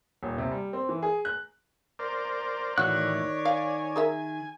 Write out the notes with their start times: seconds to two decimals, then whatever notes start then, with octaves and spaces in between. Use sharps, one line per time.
0.23 D#1
0.38 C3
0.51 G3
0.73 C4
0.89 E3
1.02 G#4
1.25 F#6
1.99 A#4 C5 D5
2.78 A2 D#3 E3 F#4 C#5 D5 F#6
3.45 F5 G#5
3.96 G#4 A#4 E5